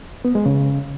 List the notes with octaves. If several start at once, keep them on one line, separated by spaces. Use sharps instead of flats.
B3
G#3
C#3